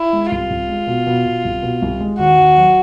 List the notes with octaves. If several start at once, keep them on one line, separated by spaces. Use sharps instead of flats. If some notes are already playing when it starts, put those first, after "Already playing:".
Already playing: E4
G#3
C2 F4
C2
G#3
B2
B2
B2
C2
B2
C2
G#3
D#2 F#4
D#2
F#3